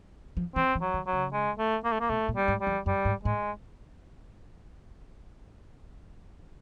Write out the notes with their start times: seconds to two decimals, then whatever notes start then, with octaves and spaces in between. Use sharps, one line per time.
0.37 F3
0.56 E3 C4
0.75 E3
0.81 F#3
0.94 D#3
1.07 F#3
1.13 C#3
1.33 G#3
1.58 A3
1.84 A#3
1.92 A3
2.00 A#3
2.09 B2 A3
2.29 A#2
2.36 G3
2.48 G#2
2.61 G3
2.67 F2
2.86 F#2 G3
3.05 G#2
3.24 A2 G#3